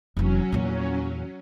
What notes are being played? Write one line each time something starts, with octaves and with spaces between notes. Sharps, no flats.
F1 E3 F#3 C#4
E2 A#2